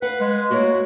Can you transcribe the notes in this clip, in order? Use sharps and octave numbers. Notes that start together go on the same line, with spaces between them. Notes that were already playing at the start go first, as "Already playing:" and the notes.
B4 F5 F#5
G#3
A#3 E4 F#4 C#5